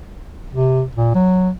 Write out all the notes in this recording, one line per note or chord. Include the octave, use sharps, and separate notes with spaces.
C3
A#2
F#3